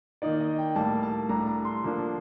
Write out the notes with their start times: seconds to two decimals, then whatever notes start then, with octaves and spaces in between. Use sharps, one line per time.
0.22 D#3 A#3 D#4 D5
0.41 D#5
0.58 G5
0.76 A2 G3 A#3 A5
1.03 A5
1.29 A2 G3 D4 A#5
1.47 A#5
1.65 C6
1.84 D3 F3 A#3 D4